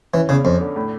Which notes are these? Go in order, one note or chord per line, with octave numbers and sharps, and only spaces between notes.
E3 C#4
E2 C#3
F2 C#4
D3
A2